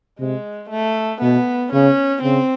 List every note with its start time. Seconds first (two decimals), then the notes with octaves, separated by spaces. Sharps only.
0.20 C3 G#3
0.70 A3
1.22 B2 B3
1.72 C#3 C#4
2.23 C#3 C4